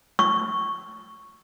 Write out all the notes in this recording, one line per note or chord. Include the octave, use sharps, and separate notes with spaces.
C#6